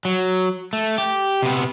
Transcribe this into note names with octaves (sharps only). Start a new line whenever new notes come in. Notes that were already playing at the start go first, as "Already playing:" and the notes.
F#3
A3
G4
C3 B3